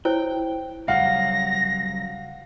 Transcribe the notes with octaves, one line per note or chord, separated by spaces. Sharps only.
E4 C5 C#5 G5
C#3 F#3 G3 F5 F#5 A#6